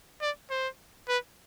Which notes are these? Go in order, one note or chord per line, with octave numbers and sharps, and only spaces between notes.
D5
C5
B4